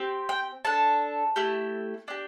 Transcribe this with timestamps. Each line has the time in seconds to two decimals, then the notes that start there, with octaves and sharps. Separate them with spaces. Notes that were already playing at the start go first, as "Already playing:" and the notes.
Already playing: C4 G4
0.29 G5
0.65 D4 A4 A5
1.36 A3 E4 G4
2.08 D4 G4